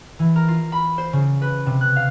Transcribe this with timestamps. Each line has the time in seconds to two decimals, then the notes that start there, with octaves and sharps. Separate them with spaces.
0.19 E3
0.36 A#4
0.48 F4
0.72 B5
0.98 C5
1.13 C#3
1.42 B4
1.66 C3
1.81 F#6
1.96 F5